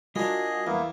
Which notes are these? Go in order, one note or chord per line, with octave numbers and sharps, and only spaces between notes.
G3 D4 F4 F#4 G#4 A#4 D#5
E2 A#3 B3 E4 F5